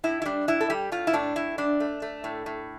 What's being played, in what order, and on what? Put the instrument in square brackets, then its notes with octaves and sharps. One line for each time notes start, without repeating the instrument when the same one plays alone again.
[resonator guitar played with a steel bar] A2 E4
E4
G3 D4
A2 E4
A4
G3 G4
A2 F4
E4
A2 D4
A2 E4
G3 D4
A3
A3
A2
A2